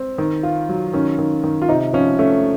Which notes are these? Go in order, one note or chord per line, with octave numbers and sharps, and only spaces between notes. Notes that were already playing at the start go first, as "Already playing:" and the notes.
Already playing: C4
D#3
F4
F#3
D#3 C#4
D#3
D#3
F4
C3 D#4
F3 C#4
A3 C#4